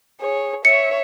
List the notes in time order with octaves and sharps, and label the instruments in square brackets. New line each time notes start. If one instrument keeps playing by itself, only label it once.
[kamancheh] G#4 C#5
[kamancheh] C#5 E5 [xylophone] C#7